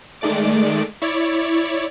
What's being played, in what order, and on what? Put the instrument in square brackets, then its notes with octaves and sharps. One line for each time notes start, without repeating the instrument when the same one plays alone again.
[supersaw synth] D#3 G#3 A3 D5 D6
E4 C#5 D5